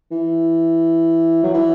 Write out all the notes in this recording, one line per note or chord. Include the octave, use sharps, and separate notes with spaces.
E3
F#3
E3